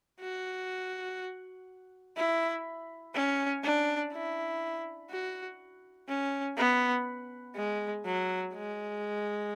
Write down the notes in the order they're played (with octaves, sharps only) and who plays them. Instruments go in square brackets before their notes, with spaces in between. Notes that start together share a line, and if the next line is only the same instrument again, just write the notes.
[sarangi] F#4
E4
C#4
D4
E4
F#4
C#4
B3
G#3
F#3
G#3